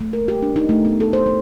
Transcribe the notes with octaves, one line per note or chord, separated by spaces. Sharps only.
A3
A#4
G4
D4
D#4
A3
B3
A4
C5
A3